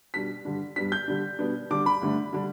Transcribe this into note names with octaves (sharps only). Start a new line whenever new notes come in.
B2 G3 D4 B6
G2 D3 G3 D4
G2 G3 B3 D4 B6
G6
D3 G3 D4
B2 G3 B3 D4
D3 G3 D4 D6
B5
G2 D3 A3 D4
D3 G3 D4